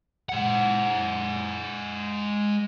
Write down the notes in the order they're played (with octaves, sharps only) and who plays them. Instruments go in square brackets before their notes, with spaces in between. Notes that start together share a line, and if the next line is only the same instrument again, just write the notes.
[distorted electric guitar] G#3 F#5